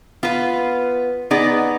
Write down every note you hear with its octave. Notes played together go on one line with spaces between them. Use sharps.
B3 F4 B4
B3 D#4 G#4 D5